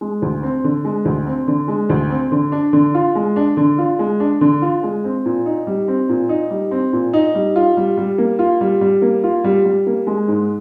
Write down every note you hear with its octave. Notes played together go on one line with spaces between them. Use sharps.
G#3
D2
C4
D3
G#3
D2
C4
D3
G#3
D2
C4
D3
D4
D3
F4
G#3
D4
D3
F4
G#3
D4
D3
F4
G#3
C4
A#2
D#4
G3
C4
A#2
D#4
G3
C4
A#2
D#4
G3
F4
G3
G3
A#3
F4
G3
G3
A#3
F4
G3
G3
A#3
G#3
G#2